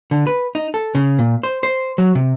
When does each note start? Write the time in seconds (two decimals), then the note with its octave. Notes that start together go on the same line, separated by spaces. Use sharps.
0.11 D3
0.27 B4
0.55 D#4
0.74 A4
0.95 C#3
1.18 A#2
1.43 C5
1.63 C5
1.98 F#3
2.15 C3